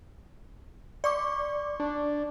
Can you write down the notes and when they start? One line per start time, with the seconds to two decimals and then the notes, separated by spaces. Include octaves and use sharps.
1.04 D5 C#6 D6
1.80 D4